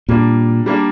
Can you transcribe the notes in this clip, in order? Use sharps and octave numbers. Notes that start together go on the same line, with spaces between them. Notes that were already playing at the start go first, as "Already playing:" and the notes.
A#2 G3 A#3 D4
G3 A#3 D4